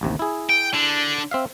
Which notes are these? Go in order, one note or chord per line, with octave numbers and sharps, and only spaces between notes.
A1 D#2 C3
E4 G#4
G5
D3
C4 E5 F5